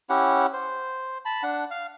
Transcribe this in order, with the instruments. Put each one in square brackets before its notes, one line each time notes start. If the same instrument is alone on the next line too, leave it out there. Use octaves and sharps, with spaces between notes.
[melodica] C#4 E4 G4 F#5
C5
A5 B5
D4 F#5
F5